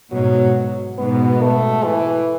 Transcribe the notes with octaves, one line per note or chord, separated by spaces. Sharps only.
G#2 B2 F#3
G#2 B2 B3
A3
E3